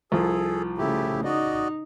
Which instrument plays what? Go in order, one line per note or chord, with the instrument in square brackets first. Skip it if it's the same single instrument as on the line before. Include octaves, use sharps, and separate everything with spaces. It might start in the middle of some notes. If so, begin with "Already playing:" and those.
[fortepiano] C2 F3 [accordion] G#4 A4
[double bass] C#3 A3 [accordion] E4 G4
[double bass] D#4 [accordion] F#4 D5 D#5